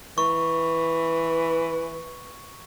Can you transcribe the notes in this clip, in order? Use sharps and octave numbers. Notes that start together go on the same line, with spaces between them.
E3 C#6